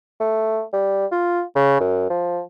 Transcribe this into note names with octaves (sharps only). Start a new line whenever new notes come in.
A3
G3
F4
C#3
F#2
F3